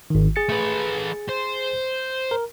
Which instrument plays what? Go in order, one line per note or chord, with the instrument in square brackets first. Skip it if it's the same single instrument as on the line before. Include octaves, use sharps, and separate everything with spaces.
[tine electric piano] G#1 D#3
G#4 A6 C#7
[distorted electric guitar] A3 B4
C5
[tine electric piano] A#4